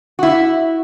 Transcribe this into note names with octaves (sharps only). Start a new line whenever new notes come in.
E4 F#4